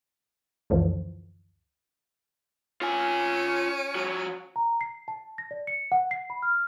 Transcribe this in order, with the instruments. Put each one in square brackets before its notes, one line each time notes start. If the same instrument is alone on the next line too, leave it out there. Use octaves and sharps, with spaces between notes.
[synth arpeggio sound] C#2 F#2 D3 E3 F3
[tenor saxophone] C#4 [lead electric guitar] F4 G#5
[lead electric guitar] F3 F#4
[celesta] A#5
C7
A5
A#6
D5
C#7
F#5
C7
B5
F6